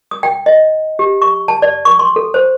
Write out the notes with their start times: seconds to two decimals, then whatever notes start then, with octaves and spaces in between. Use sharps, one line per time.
0.11 D#6
0.23 G5
0.46 D#5
0.99 G4
1.22 C#6
1.48 A5
1.62 D5
1.85 C#6
1.99 C6
2.16 A4
2.34 C5